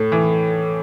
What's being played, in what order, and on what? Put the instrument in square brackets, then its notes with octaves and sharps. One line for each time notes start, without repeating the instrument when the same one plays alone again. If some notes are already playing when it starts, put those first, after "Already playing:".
Already playing: [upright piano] A2 [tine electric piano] A4
[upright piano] E3